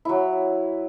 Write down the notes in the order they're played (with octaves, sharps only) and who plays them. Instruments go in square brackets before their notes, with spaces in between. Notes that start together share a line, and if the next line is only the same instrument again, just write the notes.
[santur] F#3 E4